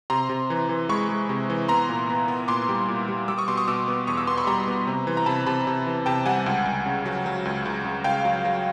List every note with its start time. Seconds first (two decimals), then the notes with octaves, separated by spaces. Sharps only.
0.10 C3 A#5 C6
0.29 C3
0.50 E3
0.69 E3
0.89 G#3 B5 C#6
1.09 G#3
1.29 C3
1.50 E3
1.68 B3 A#5 C6
1.89 A#2
2.09 B3
2.28 B3
2.48 A#2 C6 D6
2.69 G3
2.88 A#2
3.08 G3
3.28 G3 D6 E6
3.38 C#6 D#6
3.48 B2 C6 D6
3.57 C#6 D#6
3.68 B2 D6 E6
3.88 B3
4.07 E2 C#6 D#6
4.17 D6 E6
4.27 B3 C6 D6
4.38 B5 C#6
4.47 G3 A#5 C6
4.68 B3
4.87 C3
5.07 E3
5.17 A#5
5.26 C3 A5 B5
5.46 C3 A5 B5
5.67 C3
5.86 E3
6.06 C3 G5 A5
6.26 G3 F#5 G#5
6.46 C#2
6.66 C#2
6.86 C#3
7.05 F#3
7.26 F#3
7.45 C#2
7.65 C#2
7.85 C#3
8.04 C#2 F5 G5
8.25 F#3
8.45 F#3